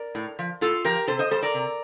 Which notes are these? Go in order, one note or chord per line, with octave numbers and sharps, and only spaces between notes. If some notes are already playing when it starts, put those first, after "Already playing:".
Already playing: A#4 D5
A2
F3
A2 F4 A4
F3 G4 A#4
C3 A4 C5
C5 D#5
G3 A4 C5
A#4 D5
C3